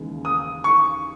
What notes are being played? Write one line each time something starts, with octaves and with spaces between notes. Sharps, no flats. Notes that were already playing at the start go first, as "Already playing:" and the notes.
Already playing: D#2 C#3 E3 G#3
D#6
C#6